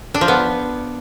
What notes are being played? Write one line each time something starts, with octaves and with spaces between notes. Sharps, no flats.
D4
F3
B3